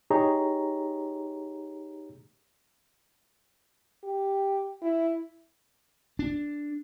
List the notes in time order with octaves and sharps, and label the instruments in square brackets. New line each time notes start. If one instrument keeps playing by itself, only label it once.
[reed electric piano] D#4 G4 G#4 C#5 A#5
[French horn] G4
E4
[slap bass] D4